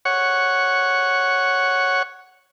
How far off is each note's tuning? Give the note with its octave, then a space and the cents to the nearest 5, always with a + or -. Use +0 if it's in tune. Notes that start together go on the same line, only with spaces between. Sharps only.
C#5 +0 F#5 +0